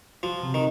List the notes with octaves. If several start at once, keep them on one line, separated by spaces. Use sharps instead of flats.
F3 F#4
C3
D#3